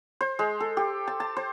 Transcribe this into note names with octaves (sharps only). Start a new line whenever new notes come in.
C5
G#3
A4
G4
A5
A5
C5